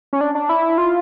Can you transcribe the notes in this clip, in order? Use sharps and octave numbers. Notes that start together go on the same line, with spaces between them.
C#4
D4
D4
E4
F4